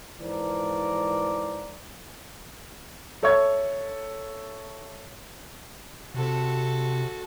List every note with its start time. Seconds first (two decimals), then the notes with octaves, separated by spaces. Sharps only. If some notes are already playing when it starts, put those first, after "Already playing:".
0.20 G#2 E3 F3 A#4 D5
3.23 A4 C#5 E5 C#6 G#6
6.14 C3 F#4 A4